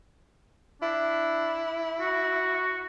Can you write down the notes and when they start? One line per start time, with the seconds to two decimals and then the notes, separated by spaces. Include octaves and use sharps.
0.82 D4 E4
2.01 F#4